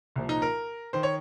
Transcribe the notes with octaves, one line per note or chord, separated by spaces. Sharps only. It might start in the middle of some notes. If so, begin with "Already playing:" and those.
C2 A#2 F3
D#4
A#4
D#3 C5
C#5